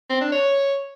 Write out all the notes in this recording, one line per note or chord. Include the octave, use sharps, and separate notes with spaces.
C4
D4
C#5